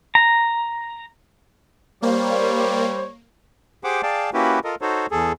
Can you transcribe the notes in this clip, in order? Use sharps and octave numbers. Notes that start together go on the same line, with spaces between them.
A#5
G3 A#3 C5 C#5
G4 G#4 C5 F#5 G5 D6
G#4 D5 F5 G5 A5
A#3 C#4 E4 F#4 G4 B4
F4 A4 A#4 D#5
D#4 F#4 A4 C5 C#5
E2 G#4 A4